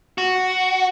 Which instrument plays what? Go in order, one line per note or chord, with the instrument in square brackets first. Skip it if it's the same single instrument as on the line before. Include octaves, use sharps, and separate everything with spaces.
[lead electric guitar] F#4